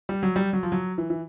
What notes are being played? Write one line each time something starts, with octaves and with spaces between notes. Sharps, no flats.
G3
F#3
G3
F#3
F3
F#3
E3
E3